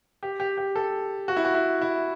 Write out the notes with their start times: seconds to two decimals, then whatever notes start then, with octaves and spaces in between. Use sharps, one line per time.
0.23 G4
0.40 G4
0.57 G4
0.76 A4
1.28 F#4
1.37 E4
1.45 F#4
1.54 E4
1.81 E4